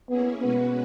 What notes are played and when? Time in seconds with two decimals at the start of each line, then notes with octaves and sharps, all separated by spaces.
0.09 A#3 B3 C#4 E4 G#4
0.42 B2 G#3 B3 C#4 F#4 B4